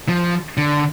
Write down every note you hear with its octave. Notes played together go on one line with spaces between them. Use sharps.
F3
D3